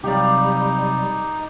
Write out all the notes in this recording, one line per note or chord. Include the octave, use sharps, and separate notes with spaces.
C3 F#3 G3 D#4 G4 D5 F5